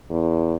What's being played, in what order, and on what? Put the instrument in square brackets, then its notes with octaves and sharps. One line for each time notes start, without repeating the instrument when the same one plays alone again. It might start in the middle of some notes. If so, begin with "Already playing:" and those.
[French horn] E2